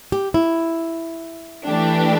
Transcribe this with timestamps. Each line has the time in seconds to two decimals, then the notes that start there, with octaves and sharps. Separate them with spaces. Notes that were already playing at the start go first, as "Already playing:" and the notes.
0.12 G4
0.34 E4
1.66 E3 A3 D4 G4